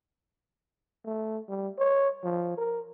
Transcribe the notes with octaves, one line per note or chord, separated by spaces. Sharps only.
A3
G3
C#5
F3
A#4